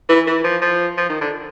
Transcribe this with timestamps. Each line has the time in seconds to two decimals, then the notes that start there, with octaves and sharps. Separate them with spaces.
0.09 E3
0.27 E3
0.44 F3
0.62 F3
0.97 F3
1.09 D#3
1.21 D3